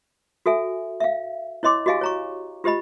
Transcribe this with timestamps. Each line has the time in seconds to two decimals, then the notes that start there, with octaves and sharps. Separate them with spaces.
0.46 F#4 A4 E5 G#5
1.01 E5 F5
1.63 E4 C#5 D#5 C6 D6
1.86 F#4 G4 D#5 F5 G#5
2.01 C#5 A#5 C#6
2.64 F4 G4 C5 D#5 B5